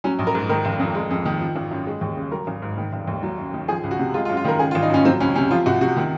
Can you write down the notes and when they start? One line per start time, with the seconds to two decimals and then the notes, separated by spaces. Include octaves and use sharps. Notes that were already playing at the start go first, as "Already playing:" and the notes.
0.04 F#3 C#4
0.19 A#1
0.27 A#4
0.35 G#2
0.49 D#3 A#4
0.65 F1
0.79 F2
0.95 G#3
1.10 F2
1.26 D#3
1.41 F3
1.56 G#1
1.71 F#2
1.86 G#3
2.01 D#2
2.17 C#3
2.31 F#3 A#4
2.47 G#1
2.62 G#2
2.78 D#3
2.92 F1
3.07 D#2
3.23 F#3
3.38 F#2
3.54 D#3
3.68 F3 G#4
3.84 C#2
3.91 F#4
3.99 C3
4.14 G#3 F4
4.25 F4
4.29 F#2
4.37 F4
4.45 D#3 A#4
4.59 C#3 G#4
4.71 F4
4.75 G#1
4.82 D#4
4.90 F#2 C#4
5.05 F#3 C4
5.20 C#2 C#4
5.35 C3 C#4
5.51 F3 F4
5.66 C2 F#4
5.81 C3 F#4
5.97 D#3